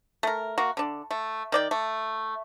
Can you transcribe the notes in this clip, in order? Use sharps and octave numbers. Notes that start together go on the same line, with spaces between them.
A3 A#4
A#3 F#4
D3 D4
A3
D#3 D5 G5
A3